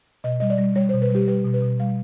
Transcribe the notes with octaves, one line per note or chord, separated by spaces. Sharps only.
B2 D#5
G3 D#5
D5
G3
G3 C#5
C5
B2
B4
G3 G4
G3 B4
B2
B4
B2
G3 F5